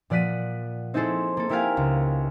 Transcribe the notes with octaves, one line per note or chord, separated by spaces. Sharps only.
A#2 F3 D5 F#5 B6 D#7
C4 D#4 E4 G#4 A4 C5
A#3 A4
A#3 E4 G4 A#4 F5 G#5
C#2